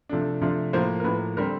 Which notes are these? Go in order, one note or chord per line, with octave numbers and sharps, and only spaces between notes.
C3 F3 A3 D4
C3 F3 A3 D4
A2 F3 A#3 C5
A#4
A2 F3 A#3 B4
D3 G3 C4 A#4